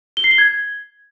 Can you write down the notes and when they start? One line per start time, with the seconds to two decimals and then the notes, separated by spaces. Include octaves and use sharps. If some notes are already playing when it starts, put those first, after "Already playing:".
0.17 G7
0.24 C7
0.31 G7
0.38 G#6